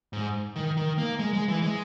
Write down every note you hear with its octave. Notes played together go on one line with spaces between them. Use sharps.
G#2
D#3
D#3
A#3
G#3
G#3
E3
G#3